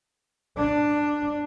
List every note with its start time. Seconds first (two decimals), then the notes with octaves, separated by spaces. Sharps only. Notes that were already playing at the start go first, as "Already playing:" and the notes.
0.57 D4